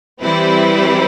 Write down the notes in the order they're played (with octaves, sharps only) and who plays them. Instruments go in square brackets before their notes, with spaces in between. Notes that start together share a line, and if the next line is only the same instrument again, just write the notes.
[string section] E3 G3 C4 E4 B4